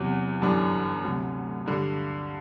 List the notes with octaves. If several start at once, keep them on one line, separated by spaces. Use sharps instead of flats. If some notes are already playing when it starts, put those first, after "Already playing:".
Already playing: E2 C3 F#3
G1 F#2 E3 G3 D4
D2 C3 F#3
G2 D3 G3